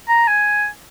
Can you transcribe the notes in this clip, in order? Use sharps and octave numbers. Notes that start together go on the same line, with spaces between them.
A#5
G#5